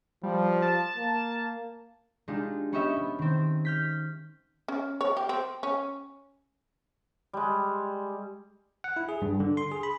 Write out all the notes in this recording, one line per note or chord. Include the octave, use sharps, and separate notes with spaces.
F3 G3
A5
A#3
G#3 D4 D#4 F4 G4
B3 C#4 G4 C#5 D#5 E5
B3
D#3 C4
F6 G6 B6
C#4
C#5
G4
C4
C#4
G3 G#3
F#5
E4
G#4
G2
D3
C6
G#4
B5